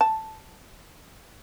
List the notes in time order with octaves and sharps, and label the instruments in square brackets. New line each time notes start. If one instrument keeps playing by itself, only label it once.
[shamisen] A5